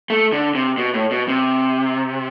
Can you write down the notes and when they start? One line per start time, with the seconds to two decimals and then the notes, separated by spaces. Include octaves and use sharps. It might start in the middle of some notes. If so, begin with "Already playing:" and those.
0.10 A3
0.33 D3
0.55 C3
0.78 B2
0.94 A2
1.11 B2
1.28 C3